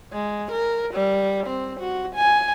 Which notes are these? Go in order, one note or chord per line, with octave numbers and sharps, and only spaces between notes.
G#3
A#4
G3
C4
F#4
G#5